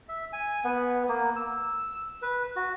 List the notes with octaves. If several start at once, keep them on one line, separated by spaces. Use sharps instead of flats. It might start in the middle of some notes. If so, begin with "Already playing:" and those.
E5
G#5
B3
A#3
E6
B4
F#4